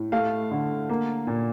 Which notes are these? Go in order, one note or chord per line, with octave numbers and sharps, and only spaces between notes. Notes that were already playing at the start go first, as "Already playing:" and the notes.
Already playing: A2
A3 F5
D3
A#3
A#2